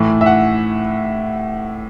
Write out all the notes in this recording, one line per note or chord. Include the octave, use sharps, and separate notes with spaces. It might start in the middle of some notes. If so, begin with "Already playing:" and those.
Already playing: A2 E3 A3
E5
F#5